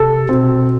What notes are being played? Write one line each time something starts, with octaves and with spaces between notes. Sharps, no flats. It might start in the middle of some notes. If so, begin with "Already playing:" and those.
Already playing: C3 A4
B2 C4